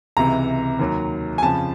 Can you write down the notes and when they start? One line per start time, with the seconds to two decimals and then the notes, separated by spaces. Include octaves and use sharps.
0.17 C#2 C3 E3 A#5
0.79 D#2 D#3 F#3
1.38 G#5
1.42 F2 C#3 F3 A5